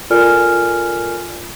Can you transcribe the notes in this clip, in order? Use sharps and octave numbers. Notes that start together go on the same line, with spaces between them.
F4 A4 A#4 D5 G#5 F6